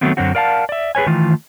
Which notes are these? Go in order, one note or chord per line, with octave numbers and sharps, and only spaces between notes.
D#3 F#3 G#3 A3 B3 C4
F#2 D3 F#3 C4 F#4
A#4 D5 F5 F#5 A5
D5 E5
G#4 B4 C#5 G#5
D#3 E3 A3 F4